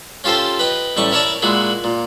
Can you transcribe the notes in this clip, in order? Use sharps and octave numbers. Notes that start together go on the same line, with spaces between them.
C#4 F4 G4 A4 C5
B4 D#5 G5
A1 G3 A3 C#6
E4 A#4 C#5 D5 A5
A#2 G#3 E4 F#4
A#2